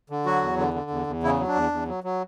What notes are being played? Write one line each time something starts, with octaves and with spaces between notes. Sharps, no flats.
D3
F#3 F#4
E2
D3
D3
E2
E2
C#3 E4
F#3
D4
E2
E2
F#3
F#3